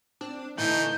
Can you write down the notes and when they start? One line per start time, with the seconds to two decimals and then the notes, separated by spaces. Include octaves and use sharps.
0.21 C4 D4
0.58 A#2 D3 E3 A3 D#4 E4 G6